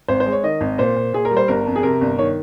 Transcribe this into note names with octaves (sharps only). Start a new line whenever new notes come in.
G#1 C5
C5
G#3
C#5
D#3 D#5
G#1
A#2 C5
A#2
A#2 G#4
A#4
G3
C5
G1 A#4
F2
G#4
C3 A#4
G1
D#3 C#5